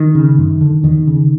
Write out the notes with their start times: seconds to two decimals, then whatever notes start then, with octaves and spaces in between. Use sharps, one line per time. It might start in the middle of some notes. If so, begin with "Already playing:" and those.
Already playing: D#3
0.15 C#3
0.38 F#2
0.61 D3
0.84 E2 D#3
1.07 C#3